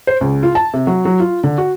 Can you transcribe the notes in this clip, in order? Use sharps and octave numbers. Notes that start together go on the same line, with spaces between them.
C5
C#2
F4
A5
C3
F#3
F#3
F4
D3
F#4